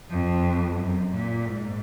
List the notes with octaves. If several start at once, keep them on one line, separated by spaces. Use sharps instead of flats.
F2
F#2
A#2
G#2